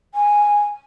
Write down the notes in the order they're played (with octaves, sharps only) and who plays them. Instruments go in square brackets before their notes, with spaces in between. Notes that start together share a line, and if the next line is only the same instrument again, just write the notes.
[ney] G#5